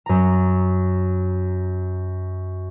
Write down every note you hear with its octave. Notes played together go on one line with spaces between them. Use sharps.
F#2 A#5